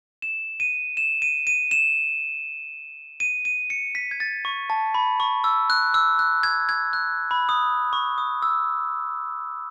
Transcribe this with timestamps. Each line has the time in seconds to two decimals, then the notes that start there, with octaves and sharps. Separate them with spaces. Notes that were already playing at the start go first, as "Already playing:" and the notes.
0.22 E7
0.60 D#7
0.97 E7
1.22 D#7
1.47 D#7
1.71 E7
3.20 D#7
3.45 D#7
3.70 C#7
3.95 B6
4.11 G#6
4.20 A6
4.45 C#6
4.70 A5
4.94 B5
5.20 C#6
5.44 E6
5.70 F#6
5.94 E6
6.19 F#6
6.43 G#6
6.69 G#6
6.93 F#6
7.31 B5
7.49 D#6
7.93 C#6
8.18 D#6
8.42 E6